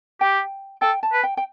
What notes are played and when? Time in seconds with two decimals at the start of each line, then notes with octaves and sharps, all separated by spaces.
0.21 G4 G5
0.82 A4 G5
1.03 A5
1.13 B4
1.23 G5
1.37 G5